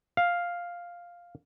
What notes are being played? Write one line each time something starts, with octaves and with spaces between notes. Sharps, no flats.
F5